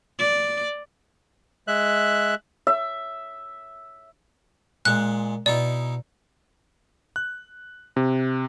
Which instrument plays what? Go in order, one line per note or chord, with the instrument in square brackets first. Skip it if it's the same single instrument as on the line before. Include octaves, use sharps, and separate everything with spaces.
[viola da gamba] D5
[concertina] G#3 E5 F#6
[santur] E5
[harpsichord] A#2 G#3 [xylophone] F#6
[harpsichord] B2 D#4 E4 [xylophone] D5
[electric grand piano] F#6
C3